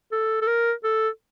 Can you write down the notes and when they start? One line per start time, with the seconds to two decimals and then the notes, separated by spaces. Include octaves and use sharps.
0.12 A4
0.41 A4
0.47 A#4
0.84 A4